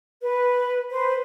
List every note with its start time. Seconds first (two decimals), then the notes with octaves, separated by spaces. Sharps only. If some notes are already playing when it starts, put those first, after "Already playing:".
0.21 B4
0.91 B4 C5